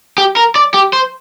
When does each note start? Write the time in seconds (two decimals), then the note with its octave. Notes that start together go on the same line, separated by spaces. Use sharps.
0.18 G4
0.37 A#4
0.56 D5
0.74 G4
0.93 C5